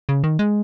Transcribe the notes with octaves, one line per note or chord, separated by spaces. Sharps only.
C#3
D#3
G#3